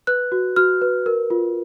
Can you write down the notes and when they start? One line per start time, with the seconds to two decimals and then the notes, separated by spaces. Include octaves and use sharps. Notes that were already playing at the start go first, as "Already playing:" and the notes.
0.07 B4 F#6
0.32 F#4
0.56 F#4 F6
0.81 B4
1.06 A#4
1.30 F4